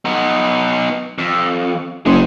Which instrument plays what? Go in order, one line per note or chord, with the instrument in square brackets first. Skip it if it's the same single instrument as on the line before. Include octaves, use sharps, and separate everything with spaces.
[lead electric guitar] B3 D#4
F2
[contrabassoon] F#1 [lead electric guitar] G#3 C5